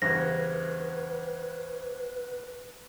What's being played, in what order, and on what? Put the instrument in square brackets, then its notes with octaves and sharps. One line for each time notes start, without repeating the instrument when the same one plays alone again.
[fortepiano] E2 G2 C#3 [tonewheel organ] B4 [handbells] C5 F#6 G#6 [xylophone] A#6